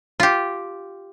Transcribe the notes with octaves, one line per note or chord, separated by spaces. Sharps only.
F4 G4